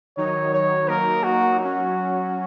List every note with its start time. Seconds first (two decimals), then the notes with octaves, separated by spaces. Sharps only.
0.17 D#3 F#3 D#4 C#5
0.53 C#5
0.88 F#3 A#3 D#4 A#4
1.23 F#4
1.59 F#3 C#4 F#4